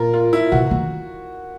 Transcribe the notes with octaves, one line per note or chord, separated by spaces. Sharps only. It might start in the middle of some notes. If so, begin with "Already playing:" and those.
Already playing: A#2 F4 A#4
F4
E4
B2 F#4
D#3